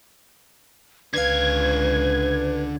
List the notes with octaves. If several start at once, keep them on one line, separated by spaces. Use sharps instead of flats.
C#2 D3 B4 F5 G#6